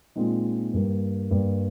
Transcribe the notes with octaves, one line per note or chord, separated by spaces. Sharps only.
A#2 G#3 C4 D#4
G2 G3 A#3
G2 G3 A#3